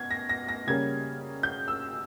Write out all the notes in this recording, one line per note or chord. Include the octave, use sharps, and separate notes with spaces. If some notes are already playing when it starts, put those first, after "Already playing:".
Already playing: B2 G#6
A#6
A#6
A#6
C#3 G3 A#3 C#4 G#6
G6
E6